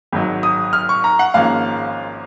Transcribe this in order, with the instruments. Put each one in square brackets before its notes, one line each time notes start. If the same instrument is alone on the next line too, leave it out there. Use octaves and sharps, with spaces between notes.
[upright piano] G#1 G#2 F#3
D#6
F6
C#6
A#5
F#5
G#1 G#2 F3 A#3 C#4 F5